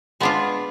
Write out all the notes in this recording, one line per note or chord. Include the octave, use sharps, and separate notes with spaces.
G#3 B3 D4 F4